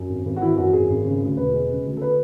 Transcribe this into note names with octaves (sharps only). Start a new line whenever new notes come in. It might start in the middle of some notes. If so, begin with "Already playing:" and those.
Already playing: F#2
G#1
G#1
F#4
E3 E4
F#2 F#4
G#1 G#4
G#1
C#3
D2
E1 B4
G#3
C#3
D2
A4
B4